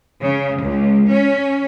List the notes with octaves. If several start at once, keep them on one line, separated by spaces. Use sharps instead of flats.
C#3
C#2
C#4